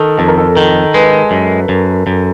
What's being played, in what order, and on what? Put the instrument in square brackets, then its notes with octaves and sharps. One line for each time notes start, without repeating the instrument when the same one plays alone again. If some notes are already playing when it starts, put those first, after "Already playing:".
Already playing: [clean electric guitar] D#3 [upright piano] A4
[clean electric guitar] F2 [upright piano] A4
[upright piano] A#4
A4
[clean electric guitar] D#3 [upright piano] A#4
[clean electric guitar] G#3 [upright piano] B4
[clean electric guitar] F#2
F#2
F#2